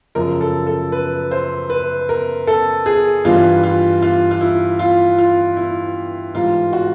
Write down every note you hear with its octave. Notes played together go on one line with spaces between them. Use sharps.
F#2 C#3 F3 A#4
A4
A4
B4
C5
B4
A#4
A4
G#4
G2 E3 G3 F4
F4
F4
F4
E4
F4
F4
E4
G#2 E3 G3 F4
F#4